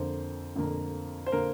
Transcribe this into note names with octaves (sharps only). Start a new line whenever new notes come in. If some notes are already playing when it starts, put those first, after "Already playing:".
Already playing: F2 D3 A#3 C5
F2 D3 A#3
C5
D3 A#3 A#4